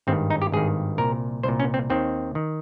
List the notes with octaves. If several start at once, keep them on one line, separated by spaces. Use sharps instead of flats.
G#1 G2 D#3 C4
D#4
G4
G#1 G2 D#3 G#4
C2 A#2 A#4
C2 A#2 C5
C#4
C4
D#2 D#3 C4
D#3